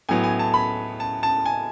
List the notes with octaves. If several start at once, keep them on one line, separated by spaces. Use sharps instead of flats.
A2 F#3 B3 G#5
G#5
A5
B5
A5
A5
G#5